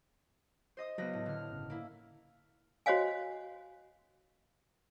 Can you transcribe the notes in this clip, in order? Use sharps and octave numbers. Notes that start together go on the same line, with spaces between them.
C5 D#5 D#6
C#2 F#3 B3 B4 A#6
A2
D3 F6
G1 C#3
A#3 E4
F#4 C5 C#5 D#5 F5 G#5